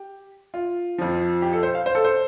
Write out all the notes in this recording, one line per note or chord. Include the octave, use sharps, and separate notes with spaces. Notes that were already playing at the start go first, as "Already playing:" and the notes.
Already playing: G4
F4
F2 F3
G4
A4
C5
F5
C5
A4
C5